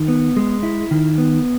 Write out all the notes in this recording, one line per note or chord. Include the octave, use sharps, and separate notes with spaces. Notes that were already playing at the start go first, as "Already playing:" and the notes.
Already playing: D#3
B3
G#3
E4
D#3
B3